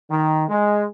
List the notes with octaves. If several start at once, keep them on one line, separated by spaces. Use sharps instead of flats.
D#3
G#3